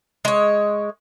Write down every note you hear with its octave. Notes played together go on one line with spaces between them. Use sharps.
G#3 C#5